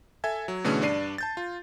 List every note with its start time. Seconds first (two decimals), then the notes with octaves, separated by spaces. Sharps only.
0.24 A4 E5 G#5 G#6
0.48 F#3
0.64 B2 D3 E3 A3 C#4 G#4
0.82 G2 D4 D5 C7 D#7
1.18 A5 G6 A6
1.37 F4